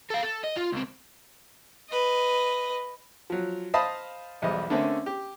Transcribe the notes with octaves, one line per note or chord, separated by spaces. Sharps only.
A4 F5
A4
D#5
F4
C#2 C4
B4 D#5
F3 F#3
C5 D#5 F5 A5 B5 D#6
B1 E2 G3 C5 D#5
D3 A3 A#3 C4 C#4
G4